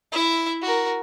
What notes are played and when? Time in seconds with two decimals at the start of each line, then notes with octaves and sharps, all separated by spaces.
0.12 E4 E5
0.62 F#4 A#4